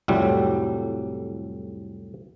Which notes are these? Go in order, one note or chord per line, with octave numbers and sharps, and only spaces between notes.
C2 F2 A2 F#3 G3